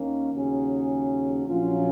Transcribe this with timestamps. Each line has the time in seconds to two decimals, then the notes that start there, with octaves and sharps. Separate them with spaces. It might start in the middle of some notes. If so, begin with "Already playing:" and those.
Already playing: D#2 D#3 A#3 C#4
0.31 D#2 C#3 F#3 C#4 G#4
1.46 A#1 A#2 F#3 C#4 F4